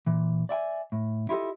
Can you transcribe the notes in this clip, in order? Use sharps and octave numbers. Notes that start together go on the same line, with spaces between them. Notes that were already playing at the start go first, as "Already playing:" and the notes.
A#2 E3
D5 E5 G5 G#5
A2
E4 F4 G4 A4 D#5